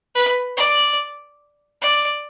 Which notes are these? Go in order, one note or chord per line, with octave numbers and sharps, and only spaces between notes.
B4
D5
D5